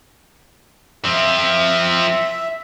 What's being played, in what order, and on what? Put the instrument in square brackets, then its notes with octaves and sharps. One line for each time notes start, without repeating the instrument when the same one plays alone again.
[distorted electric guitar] F3 C4 [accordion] E5